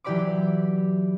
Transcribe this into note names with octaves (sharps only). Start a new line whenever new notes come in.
E3 F#3 G4 D5 B5 D6